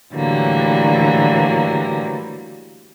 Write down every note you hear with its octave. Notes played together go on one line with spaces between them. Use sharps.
A2 D3 E3 F#3 G3 A#3